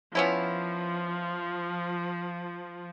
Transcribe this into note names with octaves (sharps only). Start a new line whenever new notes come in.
F3 B3 C#4 E4